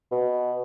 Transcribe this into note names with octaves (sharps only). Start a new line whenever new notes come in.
B2